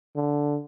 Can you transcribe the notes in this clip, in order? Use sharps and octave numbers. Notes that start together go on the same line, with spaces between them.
D3